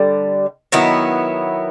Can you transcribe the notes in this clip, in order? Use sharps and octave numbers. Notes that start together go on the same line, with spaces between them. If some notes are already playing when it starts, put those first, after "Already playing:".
Already playing: D3 G3
D#3 F#3 B3 E4